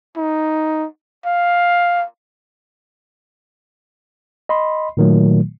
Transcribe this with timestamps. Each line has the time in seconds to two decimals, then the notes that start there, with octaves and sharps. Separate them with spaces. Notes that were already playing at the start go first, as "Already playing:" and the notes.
0.17 D#4
1.26 F5
4.49 D#5 B5 C6
4.97 A#2 D#3 F#3 A3